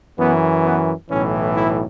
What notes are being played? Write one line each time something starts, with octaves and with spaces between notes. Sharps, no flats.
F#2 E3 B3
B3
B1 A2 E3 C#4
E4